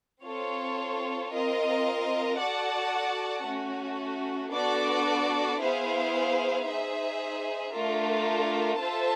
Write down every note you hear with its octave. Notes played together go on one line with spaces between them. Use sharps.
C4 F4 A4 C#5
C4 F4 A#4 D#5
F#4 A4 D5 F#5 A5
A3 C#4 F#4
B3 D4 F#4 A4 D5
B3 E4 G#4 C5 F5
D#4 G#4 C5 E5
A3 D4 F4 A#4
F4 A4 C5 E5 A5